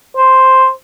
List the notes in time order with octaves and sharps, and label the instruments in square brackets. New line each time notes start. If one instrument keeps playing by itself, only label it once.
[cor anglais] C5